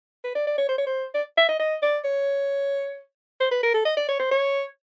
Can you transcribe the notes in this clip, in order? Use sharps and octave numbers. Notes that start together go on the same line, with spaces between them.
B4
D5
D5
C#5
C5
C#5
C5
D5
E5
D#5
D#5
D5
C#5
C5
B4
A#4
A4
D#5
D5
C#5
C5
C#5